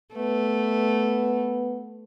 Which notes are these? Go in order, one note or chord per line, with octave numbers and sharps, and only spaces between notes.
A3 B3